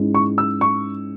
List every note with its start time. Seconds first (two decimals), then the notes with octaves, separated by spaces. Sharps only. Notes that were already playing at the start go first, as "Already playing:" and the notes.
Already playing: G#2 G#3 C#4 E4
0.15 C#6
0.38 E6
0.61 C#6